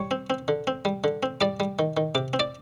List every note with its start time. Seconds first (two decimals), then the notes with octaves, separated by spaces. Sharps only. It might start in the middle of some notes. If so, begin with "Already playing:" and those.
Already playing: G3 C#5 C#6
0.11 C4
0.30 C4
0.48 D3
0.67 C4
0.85 G3
1.04 D3
1.23 C4
1.41 G3 D5 D6
1.60 G3
1.79 D#3
1.97 D#3
2.15 C3 D6
2.33 C4
2.40 D5 D6